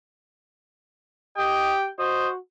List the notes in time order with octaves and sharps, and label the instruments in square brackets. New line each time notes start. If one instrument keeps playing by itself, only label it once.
[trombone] G4 [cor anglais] D#5 [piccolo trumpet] G5
[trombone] F#4 [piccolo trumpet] C5 [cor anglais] D#5